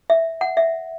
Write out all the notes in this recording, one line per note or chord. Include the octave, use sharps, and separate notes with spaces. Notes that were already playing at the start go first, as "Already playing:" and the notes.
E5
F#5
E5